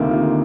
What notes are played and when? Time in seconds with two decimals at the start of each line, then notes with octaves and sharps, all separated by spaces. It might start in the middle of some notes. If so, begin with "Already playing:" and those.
Already playing: D2 C3 D#3 A#3 D#4
0.11 F4